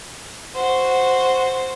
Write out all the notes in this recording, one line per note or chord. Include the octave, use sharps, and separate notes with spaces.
F#4 C5